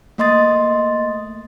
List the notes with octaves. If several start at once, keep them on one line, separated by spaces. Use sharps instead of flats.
A3 A#3 D#5 C6 D#6 A6